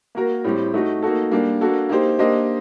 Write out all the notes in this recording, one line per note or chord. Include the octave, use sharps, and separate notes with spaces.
A#3 F#4 A#4
A2 G3 C4 G4
A3 D#4 F#4
A#3 D#4 F#4 A4
G3 A#3 D4
A#3 D4 F#4 A4
A#3 D#4 G4 C5
A#3 D4 G4 C5 D#5